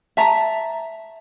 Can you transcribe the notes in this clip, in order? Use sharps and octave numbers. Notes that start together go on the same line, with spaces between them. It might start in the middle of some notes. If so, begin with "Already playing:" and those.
E5 A5 A#5